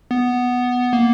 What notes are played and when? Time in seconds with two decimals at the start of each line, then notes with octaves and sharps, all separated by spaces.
0.11 B3
0.93 A#3